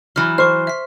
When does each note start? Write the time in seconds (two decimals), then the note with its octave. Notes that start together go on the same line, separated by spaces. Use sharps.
0.16 E3 F#3 F6
0.38 C5 C#6 F6
0.67 E5 B6